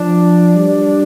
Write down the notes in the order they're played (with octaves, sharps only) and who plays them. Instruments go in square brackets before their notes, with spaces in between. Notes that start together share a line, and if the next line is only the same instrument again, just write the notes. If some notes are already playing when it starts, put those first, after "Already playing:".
Already playing: [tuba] F3 [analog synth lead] D4
[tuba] G3